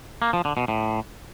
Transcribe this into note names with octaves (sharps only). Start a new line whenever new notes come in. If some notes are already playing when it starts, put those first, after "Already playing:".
A#3
F3
D3
B2
A2